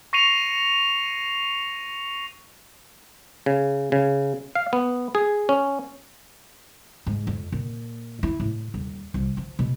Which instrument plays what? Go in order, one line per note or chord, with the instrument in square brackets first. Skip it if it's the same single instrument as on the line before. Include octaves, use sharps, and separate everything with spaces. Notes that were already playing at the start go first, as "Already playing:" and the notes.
[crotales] C#6 A#6 C7 C#7 D#7 F7
[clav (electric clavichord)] C#3
C#3
F5
B3
G#4
C#4
[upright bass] G#2
F2
A#2
E4
A2
D#1
C2
F3
B2